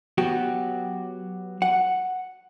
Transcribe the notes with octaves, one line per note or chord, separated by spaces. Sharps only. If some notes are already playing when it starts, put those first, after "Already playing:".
F#3 B3 F#4 G4
F#5